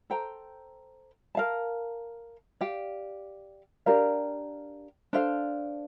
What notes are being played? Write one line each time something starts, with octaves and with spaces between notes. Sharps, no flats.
A4 C5 G5 A#5
A#4 F5 A5
G4 D5 F5
D4 G4 A#4 F5
D4 A4 C5 F5